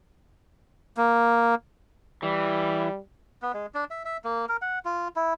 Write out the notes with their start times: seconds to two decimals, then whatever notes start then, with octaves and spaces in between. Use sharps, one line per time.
0.97 A#3
2.23 E3 G3
3.42 B3
3.54 G#3
3.74 D4
3.91 E5
4.05 E5
4.24 A#3
4.49 A#4
4.62 F#5
4.85 F4
5.16 E4